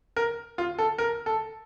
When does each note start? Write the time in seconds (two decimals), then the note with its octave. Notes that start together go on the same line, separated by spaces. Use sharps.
0.16 A#4
0.58 F4
0.79 A4
0.98 A#4
1.26 A4